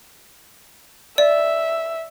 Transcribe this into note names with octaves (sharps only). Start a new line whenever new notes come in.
D5 E5